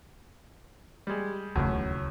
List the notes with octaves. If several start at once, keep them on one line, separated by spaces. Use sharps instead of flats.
G3 G#3
D#1 C#2 F#2 A2 C#3